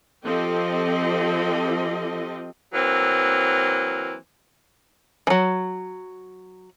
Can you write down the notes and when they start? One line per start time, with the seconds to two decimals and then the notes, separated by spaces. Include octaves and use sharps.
0.24 F3 C4 G4 A4 D#5
2.74 E3 F#3 A#3 C4
5.27 E3 F#3